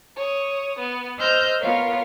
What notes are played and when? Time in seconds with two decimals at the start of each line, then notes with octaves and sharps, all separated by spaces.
0.16 C#5 D#6
0.78 B3
1.17 C5 D#5 E6 F6 G6 A#6
1.60 B3 F4 A#4 C#5 F5